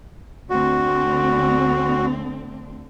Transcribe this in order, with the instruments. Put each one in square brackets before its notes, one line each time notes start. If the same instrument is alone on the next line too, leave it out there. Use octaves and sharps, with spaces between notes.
[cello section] D2 D3 C4 [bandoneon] F#4